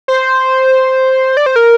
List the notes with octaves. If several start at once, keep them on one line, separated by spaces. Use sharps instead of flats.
C5
D5
C5
A#4